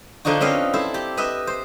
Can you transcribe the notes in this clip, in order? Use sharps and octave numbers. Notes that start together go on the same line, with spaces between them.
D3 F3 D4 D#4 F#4
C4 C#4 B4 D#5 F5
E4 A4 C5
G4
B4 D#5 E5
C5